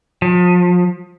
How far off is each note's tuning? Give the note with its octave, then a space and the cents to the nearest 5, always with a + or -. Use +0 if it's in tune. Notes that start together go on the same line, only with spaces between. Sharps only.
F3 +35